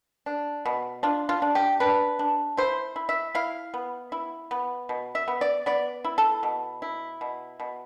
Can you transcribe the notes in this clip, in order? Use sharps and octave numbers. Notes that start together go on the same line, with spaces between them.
D4
B2
D4 F4
F4
D4
G4
D4 B4
D4
E4 C5
E4
E5
E4 F5
B3
E4
B3
B2
E5
B3
D5
B3 D5
E4
A4
B2
E4
B2
B2